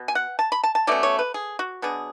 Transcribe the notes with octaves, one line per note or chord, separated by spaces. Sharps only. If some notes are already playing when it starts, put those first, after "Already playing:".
Already playing: B2
G#5
F#5
A5
B5
A5
A5
B2 A3 C#4 D5
C#5
B4
G#4
F#4
B2 F#3 B3 D4 G#4